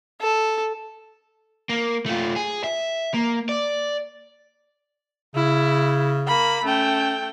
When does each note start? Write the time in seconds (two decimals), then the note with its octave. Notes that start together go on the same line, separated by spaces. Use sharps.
0.21 A4
1.69 A#3
2.06 A3 F4
2.36 G#4
2.64 E5
3.14 A#3
3.49 D5
5.36 C#3 E4
6.27 A#3 B5
6.64 A3 C#4 G5